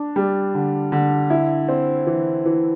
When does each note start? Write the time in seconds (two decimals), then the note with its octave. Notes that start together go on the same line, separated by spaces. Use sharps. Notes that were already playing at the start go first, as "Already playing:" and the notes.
Already playing: D4
0.16 G3
0.55 D3
0.92 D3
1.30 E4
1.68 C4
2.07 E3
2.45 E3